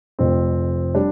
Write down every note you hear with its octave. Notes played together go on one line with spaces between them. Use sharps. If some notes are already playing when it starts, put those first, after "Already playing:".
F1 F2 F3 C4
G3 D4